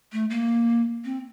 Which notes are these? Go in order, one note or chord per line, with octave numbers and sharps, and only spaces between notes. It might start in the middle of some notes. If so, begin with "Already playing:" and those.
A3
A#3
C4